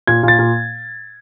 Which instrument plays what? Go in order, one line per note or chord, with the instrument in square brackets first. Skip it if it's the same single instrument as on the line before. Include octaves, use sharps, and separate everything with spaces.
[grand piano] A#2 G#6
A#2
A6
A#2